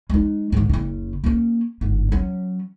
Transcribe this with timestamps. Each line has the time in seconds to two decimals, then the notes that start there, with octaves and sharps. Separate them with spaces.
0.10 G#3 D#4
0.52 G#2 D#3
0.70 F#1 C#3
1.24 A#3 C#4
1.81 G1 G#2
2.12 F#3 C#4